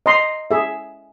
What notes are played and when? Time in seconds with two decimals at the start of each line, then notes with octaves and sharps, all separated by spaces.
0.06 D#5 A#5 C6
0.51 G#4 E5